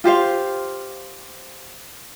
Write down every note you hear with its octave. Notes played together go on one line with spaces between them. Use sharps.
F4 G4 C5 F5